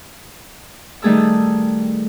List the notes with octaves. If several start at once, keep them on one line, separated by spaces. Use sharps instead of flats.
D#3 G3 A3 G#4 A5 E6